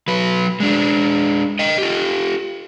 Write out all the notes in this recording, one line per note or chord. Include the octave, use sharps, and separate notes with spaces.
F#3 B4
G#3 D4
D#5 G5
F4 G4